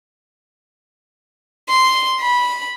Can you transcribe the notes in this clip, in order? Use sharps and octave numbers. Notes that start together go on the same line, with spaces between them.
C6
B5